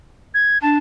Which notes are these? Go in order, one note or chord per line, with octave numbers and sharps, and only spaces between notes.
G#6
D4 A5